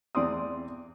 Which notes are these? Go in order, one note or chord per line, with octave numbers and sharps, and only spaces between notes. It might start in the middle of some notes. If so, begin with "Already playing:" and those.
E2 C4 D5 C6 D#6